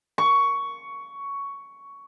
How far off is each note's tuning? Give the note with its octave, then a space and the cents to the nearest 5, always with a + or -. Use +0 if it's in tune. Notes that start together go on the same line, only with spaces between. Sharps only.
C#6 +10